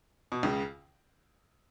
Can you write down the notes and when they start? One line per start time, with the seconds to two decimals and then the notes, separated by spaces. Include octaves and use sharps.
0.32 B2
0.43 C#2 C#3